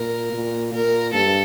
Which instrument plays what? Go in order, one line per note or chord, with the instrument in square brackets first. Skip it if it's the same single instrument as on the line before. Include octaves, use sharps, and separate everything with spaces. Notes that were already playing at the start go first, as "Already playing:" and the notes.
Already playing: [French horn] A#2 [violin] A#4
[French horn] A#2
[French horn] A#2 [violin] A#4
[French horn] G2 [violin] A4